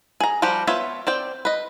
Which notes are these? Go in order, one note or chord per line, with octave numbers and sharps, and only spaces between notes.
G#4 A#5
F3 G3 F#4 G4
B3 F4 C#5 E5
C4 D5 G5
B4 D#5